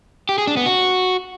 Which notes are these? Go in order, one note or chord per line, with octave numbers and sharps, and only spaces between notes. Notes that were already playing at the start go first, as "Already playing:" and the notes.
G4
G#4
D4
B3
F#4